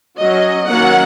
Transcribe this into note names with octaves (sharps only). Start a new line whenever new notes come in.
F#3 C#4 D#5
D#3 F#3 A#3 C#4 F#5